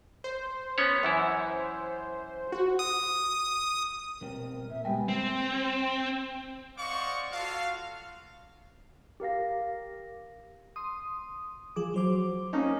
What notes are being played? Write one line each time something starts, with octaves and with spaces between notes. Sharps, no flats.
C5
B3 C#4 C#5
F#2 E3 E4
F#4
D#6
B2 G3 C4 A#4
A#2 E5
C#2 G3 G#3 B3 G4 G5 G#5
C4
C5 D5 D#5 F5 F#5 C#6
F4 F#4 A4 F5
G4 A#4 F5 A#6
C6 D#6
F3 G#4 D6
F#3 C5 D6
A#3 C#4 D#4